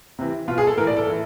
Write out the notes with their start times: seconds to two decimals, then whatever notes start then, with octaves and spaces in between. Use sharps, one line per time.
0.19 C3 E3
0.48 B2 F4
0.58 G#4
0.67 A4
0.77 A2 E3 A#4
0.87 D5
0.97 A4
1.07 A2 E3